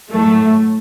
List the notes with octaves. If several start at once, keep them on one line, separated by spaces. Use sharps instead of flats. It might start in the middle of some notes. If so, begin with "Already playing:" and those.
A2 F#3 A3